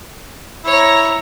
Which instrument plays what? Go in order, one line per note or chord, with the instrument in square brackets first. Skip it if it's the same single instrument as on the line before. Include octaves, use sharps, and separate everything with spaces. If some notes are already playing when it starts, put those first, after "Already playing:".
[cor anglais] E4 [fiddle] C#5 A#5